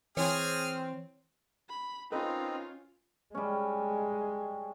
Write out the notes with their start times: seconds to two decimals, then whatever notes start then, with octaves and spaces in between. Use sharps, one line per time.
0.17 E3 C4 G#4 C#5 G#5 F6
1.69 B5
2.11 C4 C#4 D#4 F4 A#4 B4 D#5
3.35 G3 G#3 C#4